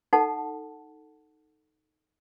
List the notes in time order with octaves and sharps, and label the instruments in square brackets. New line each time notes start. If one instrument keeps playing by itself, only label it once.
[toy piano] D#4 A4 F#5 A5